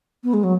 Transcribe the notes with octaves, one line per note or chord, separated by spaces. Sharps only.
B3
G#3
F#3